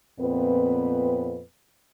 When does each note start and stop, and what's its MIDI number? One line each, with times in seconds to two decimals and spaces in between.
0.19 1.42 41
0.19 1.42 46
0.19 1.42 59
0.19 1.42 60
0.19 1.42 71